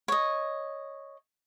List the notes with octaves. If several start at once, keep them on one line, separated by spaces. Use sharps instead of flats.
C#5 D#5